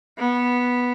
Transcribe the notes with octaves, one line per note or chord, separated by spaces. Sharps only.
B3